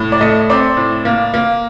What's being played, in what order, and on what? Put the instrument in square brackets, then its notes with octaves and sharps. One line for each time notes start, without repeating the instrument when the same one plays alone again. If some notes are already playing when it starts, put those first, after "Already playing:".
Already playing: [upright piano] A2
D5
A3 D#5
C4 D5
A2
A#3
A#3